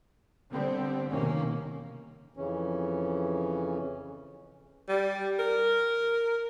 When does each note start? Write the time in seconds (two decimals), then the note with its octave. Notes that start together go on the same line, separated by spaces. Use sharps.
0.51 D3 G3 B3 C4
1.09 F1 B2 D#3 A#3 C#4
2.37 F2 C#3 E3 C#4
4.88 G3
5.39 A#4